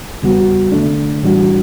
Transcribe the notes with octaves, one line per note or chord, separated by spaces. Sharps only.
E2 C#3 G3 B3 F#4
D3 A3 D4
A2 E3 G3 D4 F#4